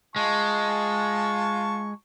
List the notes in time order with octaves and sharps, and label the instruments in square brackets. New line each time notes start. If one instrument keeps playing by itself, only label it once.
[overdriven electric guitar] G#3 [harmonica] F4 A5 C#6